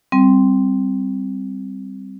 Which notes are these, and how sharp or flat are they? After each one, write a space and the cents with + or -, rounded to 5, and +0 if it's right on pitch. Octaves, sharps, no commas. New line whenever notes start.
G3 +0 C4 +0